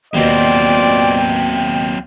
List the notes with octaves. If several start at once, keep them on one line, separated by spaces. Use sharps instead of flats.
D#2 B2 F#3 C4 F4 D5 G5